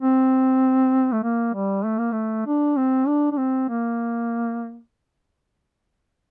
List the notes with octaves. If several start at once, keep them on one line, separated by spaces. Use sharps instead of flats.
C4
A3
A#3
G3
A3
A#3
A3
D4
C4
D4
D4
C4
A#3